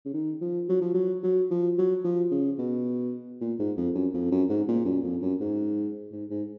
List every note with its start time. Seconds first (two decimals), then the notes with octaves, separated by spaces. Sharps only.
0.05 C#3
0.14 D#3
0.41 F3
0.69 F#3
0.81 F3
0.94 F#3
1.23 F#3
1.51 F3
1.78 F#3
2.04 F3
2.31 C#3
2.59 B2
3.41 A#2
3.59 G#2
3.77 F2
3.95 F#2
4.14 F2
4.31 F#2
4.49 G#2
4.68 A#2
4.85 F#2
5.04 F2
5.21 F#2
5.41 G#2
6.12 G#2
6.30 G#2